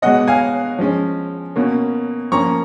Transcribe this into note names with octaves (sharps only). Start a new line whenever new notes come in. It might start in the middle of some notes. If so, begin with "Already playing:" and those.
B2 G#3 B3 D#5 F#5
F5 G#5
F3 G#3 C#4
B2 A#3 C#4
F3 A#3 C#4 A#5 C#6